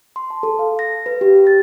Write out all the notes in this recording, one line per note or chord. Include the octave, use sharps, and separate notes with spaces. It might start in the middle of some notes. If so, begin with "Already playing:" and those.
C6
A5
A4
F5
A#6
B4
G4
A6